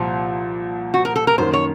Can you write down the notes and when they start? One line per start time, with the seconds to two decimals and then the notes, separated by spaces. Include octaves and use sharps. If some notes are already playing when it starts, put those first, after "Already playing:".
Already playing: C2 A#2 F3 F4
0.94 F#4
1.05 A#4
1.16 A4
1.27 A#4
1.38 F#2 D#3 A#3 C5
1.53 C#5